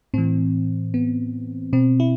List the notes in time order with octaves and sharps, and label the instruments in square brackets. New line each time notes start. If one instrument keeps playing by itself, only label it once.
[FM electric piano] A2 E3 C4
B3
B2 C4
E4